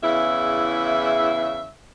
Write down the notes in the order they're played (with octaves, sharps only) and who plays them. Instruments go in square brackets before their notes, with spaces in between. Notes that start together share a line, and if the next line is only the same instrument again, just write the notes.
[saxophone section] E2 C#3 E4 E5